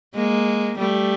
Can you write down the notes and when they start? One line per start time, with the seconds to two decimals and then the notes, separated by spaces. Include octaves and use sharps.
0.15 G#3 A#3
0.78 G3 A3